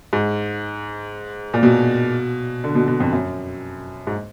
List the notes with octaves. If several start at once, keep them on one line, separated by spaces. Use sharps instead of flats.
G#2
A#2
B2
D3
B2
B2
F2
F#2
G#2